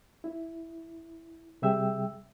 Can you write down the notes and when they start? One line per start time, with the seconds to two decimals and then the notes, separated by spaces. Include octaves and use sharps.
0.24 E4
1.62 C3 G3 G#4 E5 G5 E6